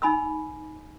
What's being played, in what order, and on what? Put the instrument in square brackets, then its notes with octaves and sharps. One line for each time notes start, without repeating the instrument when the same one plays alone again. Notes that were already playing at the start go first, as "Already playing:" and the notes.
[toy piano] D#4 G#5 B5 C6 E6